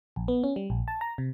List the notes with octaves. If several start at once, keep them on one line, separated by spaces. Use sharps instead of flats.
A#1
B3
C#4
G3
A#1
A5
A#5
C3